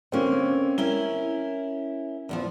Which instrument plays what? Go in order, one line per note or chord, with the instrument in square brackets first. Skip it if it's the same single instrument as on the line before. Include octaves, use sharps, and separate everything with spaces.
[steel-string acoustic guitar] D3 A#3 [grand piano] C4 C#4
[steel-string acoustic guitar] C#4 E4 A#4 [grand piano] G7
[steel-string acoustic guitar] E2 G2 F3